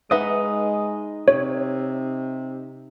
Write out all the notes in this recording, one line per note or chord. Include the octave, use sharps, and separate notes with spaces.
G#3 D#4 B4 D#5 E5 F#5
C3 C#5